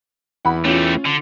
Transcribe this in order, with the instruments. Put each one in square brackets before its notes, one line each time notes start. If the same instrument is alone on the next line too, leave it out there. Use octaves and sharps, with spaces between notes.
[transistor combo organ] E2 [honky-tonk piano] F#5 B5
[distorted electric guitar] A3 G4 [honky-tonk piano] C#4 F4
[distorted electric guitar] D3